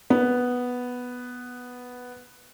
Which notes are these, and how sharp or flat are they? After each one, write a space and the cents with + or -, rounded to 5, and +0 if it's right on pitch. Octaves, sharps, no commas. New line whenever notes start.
B3 +0